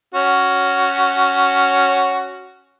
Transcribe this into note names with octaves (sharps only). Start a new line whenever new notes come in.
C#4 F#4